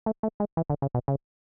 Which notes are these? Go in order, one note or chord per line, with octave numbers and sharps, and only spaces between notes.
A3
A3
G#3
E3
D3
C#3
B2
C#3